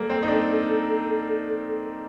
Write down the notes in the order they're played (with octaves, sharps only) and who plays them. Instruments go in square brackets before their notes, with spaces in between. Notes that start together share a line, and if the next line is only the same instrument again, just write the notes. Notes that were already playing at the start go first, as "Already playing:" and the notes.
Already playing: [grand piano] G3 A#3 [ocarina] A4
[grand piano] C4
D#4
D4